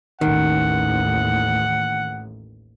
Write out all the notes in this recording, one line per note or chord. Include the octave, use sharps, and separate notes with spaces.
A1 D#2 D#3 F#5